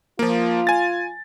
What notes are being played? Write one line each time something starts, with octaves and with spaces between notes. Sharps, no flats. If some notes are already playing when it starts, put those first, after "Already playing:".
F3 A#3 F4
G#5 A6